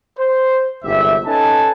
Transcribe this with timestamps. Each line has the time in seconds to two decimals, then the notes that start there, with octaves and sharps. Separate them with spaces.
0.18 C5
0.84 G1 C2 G#2 G4 E5
1.26 C#4 D#4 A4 B4 G#5 A5